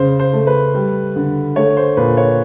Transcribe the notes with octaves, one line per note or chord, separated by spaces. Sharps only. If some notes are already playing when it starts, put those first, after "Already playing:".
Already playing: C#3 C5
C5
A3
B4
G3
D3
A3 C#5
C5
A#2 B4
C#5